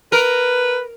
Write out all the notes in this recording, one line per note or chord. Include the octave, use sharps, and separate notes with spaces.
A#4 B4